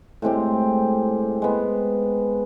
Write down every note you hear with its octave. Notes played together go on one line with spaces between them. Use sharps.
A2 G#3 C4 G4
G#3 B3